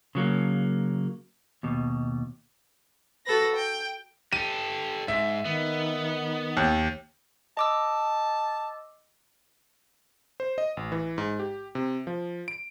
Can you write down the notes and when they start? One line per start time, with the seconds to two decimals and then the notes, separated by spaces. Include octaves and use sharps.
0.15 C#3 F#3 A#3
1.63 D#2 B2
3.25 F#4 A4 B4 A#6
3.56 G5
4.33 G4 A4 D#7
5.08 G#2 E5
5.45 D#3 B3
6.57 D#2
7.57 D#5 A5 D6 E6
10.40 C5
10.58 D#5
10.77 A1
10.92 E3
11.18 G#2
11.39 G4
11.75 C3
12.07 F3
12.48 D7